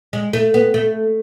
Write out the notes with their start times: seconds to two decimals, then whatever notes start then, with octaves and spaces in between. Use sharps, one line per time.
0.13 G#3
0.33 A3
0.54 B3
0.74 A3